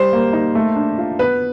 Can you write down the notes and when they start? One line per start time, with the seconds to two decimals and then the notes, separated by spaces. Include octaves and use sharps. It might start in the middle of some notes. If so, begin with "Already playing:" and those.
Already playing: G3 C5
0.13 A#3
0.33 D#4
0.55 A3
0.76 D4
0.98 F4
1.19 B3 B4